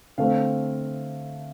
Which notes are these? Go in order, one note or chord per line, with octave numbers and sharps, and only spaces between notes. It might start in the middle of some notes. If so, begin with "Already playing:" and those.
D3 A3 C4 F5